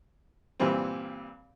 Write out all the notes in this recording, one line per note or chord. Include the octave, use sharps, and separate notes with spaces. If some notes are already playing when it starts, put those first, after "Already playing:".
G2 A#2 E3 G3 C4